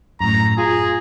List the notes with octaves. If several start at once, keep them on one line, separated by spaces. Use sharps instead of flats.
F#2 A2 A#5
F4 G#4